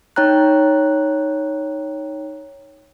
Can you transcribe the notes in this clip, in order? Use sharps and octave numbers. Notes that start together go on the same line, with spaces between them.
D#4 C#5 G5 A#5 F#6